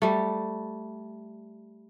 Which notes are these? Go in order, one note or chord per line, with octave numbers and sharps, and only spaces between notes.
G3 A3